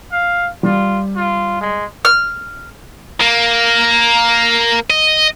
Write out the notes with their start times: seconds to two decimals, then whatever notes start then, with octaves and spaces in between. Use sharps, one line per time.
0.11 F5
0.63 G3 F4
1.16 F4
1.61 G#3
2.05 F6
3.20 A#3
4.90 D#5